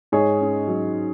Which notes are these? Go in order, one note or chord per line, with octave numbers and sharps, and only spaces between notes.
G#2 G#4 C#5
C#4
F#3